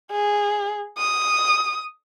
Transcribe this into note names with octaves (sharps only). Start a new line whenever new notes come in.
G#4
D#6